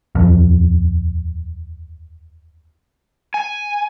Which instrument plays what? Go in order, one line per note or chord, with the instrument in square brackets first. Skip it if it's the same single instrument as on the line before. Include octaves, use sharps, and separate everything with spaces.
[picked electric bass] D#1 F2
[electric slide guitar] G#5